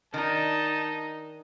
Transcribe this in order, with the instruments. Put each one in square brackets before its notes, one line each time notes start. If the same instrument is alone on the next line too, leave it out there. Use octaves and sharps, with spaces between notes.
[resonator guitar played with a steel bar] D#3 D4 [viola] D#4 [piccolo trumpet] A5